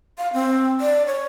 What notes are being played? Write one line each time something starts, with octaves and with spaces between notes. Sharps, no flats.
F5
C4
D5
C#5